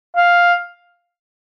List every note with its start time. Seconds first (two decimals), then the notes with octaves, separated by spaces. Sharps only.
0.17 F5